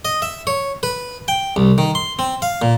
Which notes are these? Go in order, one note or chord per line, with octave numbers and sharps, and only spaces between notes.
D#5
E5
C#5
B4
G5
C2
D#3
C6
C4
F5
A#2